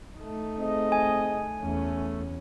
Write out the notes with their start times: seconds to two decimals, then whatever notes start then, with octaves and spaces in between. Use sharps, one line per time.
0.18 A3 D#4
0.59 C4 G#4 D#5
0.92 G#5
1.61 E2 A3 C#4